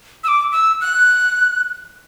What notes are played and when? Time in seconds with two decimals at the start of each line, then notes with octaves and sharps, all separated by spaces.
0.24 E6
0.28 D6
0.52 E6
0.81 F#6